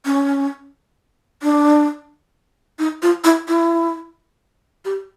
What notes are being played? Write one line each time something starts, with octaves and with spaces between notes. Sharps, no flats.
C#4
D4
D#4
F4
E4
E4
G4